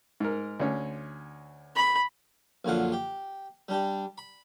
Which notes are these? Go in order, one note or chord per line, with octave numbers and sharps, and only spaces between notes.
G#2 A#4
D2 C#4
B5
A#1 F#2 D3 F4 F#5
G4
G3 D4 G4
B5